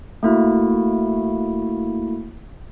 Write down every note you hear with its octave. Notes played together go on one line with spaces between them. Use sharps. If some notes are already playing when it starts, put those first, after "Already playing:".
A3 A#3 E4 F#4